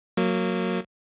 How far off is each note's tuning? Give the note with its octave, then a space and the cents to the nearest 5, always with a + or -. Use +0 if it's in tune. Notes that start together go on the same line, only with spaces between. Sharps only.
F#3 -10 A#3 -15